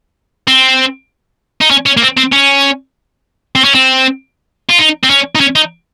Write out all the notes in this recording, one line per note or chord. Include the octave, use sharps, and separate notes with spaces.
C4
D#4
C#4
C#4
A#3
C4
C4
C#4
C4
C#4
C4
F4
D#4
C4
C#4
D#4
C#4
D#4